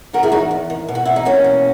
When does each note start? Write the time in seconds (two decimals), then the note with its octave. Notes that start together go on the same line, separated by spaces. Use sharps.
0.13 D#3 F#4 A#4
0.23 E4 G#4
0.32 E2 D#4 F#4
0.51 E2
0.70 D#3
0.88 B2
0.95 F#4
1.05 E2 E4
1.16 D#4
1.25 E2 A#3 C#4
1.44 B2